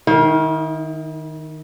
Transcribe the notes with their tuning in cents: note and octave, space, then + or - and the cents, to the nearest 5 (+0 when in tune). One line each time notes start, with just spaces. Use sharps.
D#3 -5 E4 -45 F5 +0